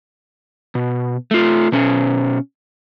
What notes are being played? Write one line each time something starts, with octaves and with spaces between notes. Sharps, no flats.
B2
A3 F4
B2 C#4